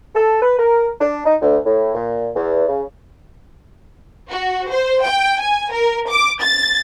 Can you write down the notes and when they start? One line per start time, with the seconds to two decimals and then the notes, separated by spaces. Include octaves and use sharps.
0.15 A4
0.42 B4
0.59 A#4
1.00 D4
1.25 D#4
1.42 D2
1.65 A2
1.95 A#2
2.35 E2
2.68 C#3
4.30 F#4
4.69 C5
5.03 G5
5.39 G#5
5.71 A#4
6.08 D6
6.41 A6